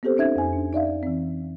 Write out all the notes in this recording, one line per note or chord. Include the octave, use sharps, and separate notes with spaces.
B3 C4 G4 A4 C5
C#4 D#4 E5 G#6
F2 G#5
D4
D#4 D5 E5 F5
E3 C4